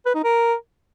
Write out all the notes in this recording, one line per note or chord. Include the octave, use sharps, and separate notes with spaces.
B4
D#4
A#4